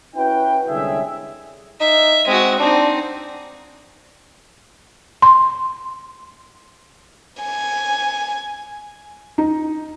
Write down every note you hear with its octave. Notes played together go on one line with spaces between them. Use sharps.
C#4 E4 F#4 B4 G5
C2 D3 G#3 C#4 G#4 E5
D#4 E5
G#3 C4 F#4
C4 D4 D#4
C6
G#5
D#4